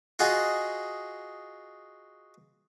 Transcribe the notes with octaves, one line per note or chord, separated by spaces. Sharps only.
F4 F#4 G#4 D#5